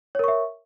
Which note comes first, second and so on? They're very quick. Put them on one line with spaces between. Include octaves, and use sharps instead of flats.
C#5 A#4 C#6 E5